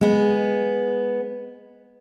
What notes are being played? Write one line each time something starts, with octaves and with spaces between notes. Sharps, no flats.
G#3 B3